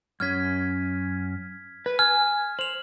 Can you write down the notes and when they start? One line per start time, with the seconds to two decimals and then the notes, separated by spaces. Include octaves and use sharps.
0.20 F#2 C#4 F6 G#6 B6
1.86 B4
1.99 G#5 F6
2.59 C5 F7 F#7